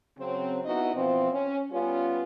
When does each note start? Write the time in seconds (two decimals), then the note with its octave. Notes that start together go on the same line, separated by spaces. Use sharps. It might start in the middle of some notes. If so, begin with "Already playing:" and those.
0.18 C#3 F#3 C4
0.65 B3 D#4 E4 F#4 D#5
0.94 B2 E3 F3 C4
1.32 C#4
1.72 G3 B3 C#4 F4